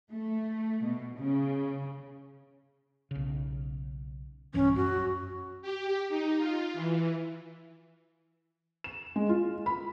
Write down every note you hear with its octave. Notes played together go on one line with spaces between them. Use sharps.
A3
B2
C#3
B1 C#3
A#1 G2 E3 C#4
F#2 F#4
G4
D#4
F4
E3
E7
G#3
F4
B5